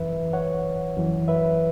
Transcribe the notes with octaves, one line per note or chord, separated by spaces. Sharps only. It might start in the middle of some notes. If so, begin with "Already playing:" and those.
Already playing: F#2 E3 B4 E5
C#5 F#5
F#2 E3
B4 E5